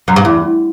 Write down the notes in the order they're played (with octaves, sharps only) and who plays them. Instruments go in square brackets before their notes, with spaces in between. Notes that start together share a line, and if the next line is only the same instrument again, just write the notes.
[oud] F#2
G2
E2